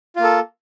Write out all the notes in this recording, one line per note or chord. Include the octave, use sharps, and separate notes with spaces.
A#3 F4 A4